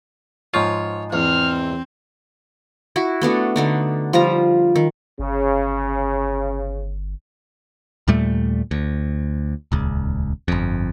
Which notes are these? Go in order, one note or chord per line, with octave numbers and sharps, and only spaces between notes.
G#2 F3 F4 C#5
E2 C4 F6
E4 F#4
A3 B3 D4 F#4
D3 D4 D#4
F3 G3 F4 A#5
D#3
G1 C#3
D#2 A#2 G3 A3
D2
D#1 C#2
G1 F2